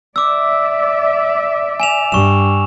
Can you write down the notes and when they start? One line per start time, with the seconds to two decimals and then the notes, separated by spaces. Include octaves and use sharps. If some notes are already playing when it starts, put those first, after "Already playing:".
0.16 D5 E5 D6 E6
1.80 G#5 E7 F7
2.12 G2 C#6 E7